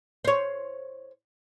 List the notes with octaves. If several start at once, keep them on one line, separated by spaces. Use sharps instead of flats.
C5 C#5